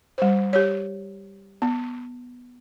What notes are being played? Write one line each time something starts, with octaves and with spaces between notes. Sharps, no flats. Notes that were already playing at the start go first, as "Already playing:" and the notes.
G3 C5
G4 C#5
B3